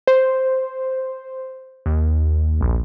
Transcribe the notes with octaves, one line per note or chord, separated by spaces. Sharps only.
C5
D#2
A#1